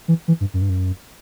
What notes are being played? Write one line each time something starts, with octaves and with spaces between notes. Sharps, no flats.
E3
E3
G2
F#2
G2
F#2